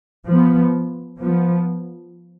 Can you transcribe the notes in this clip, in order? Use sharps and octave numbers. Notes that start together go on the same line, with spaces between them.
F3 B3
F3 B3